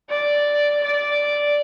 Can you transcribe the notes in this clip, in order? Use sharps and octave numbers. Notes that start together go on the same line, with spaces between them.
D5
D5